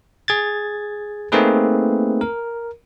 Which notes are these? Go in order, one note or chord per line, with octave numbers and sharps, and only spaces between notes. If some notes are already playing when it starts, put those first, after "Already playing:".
G#4 G#6 A6
A3 A#3 C4 D#4 G#4 B4
A#4